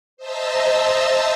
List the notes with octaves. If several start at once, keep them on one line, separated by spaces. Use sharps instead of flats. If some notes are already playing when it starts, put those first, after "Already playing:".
C5 D#5 E5 A5 A#5 E6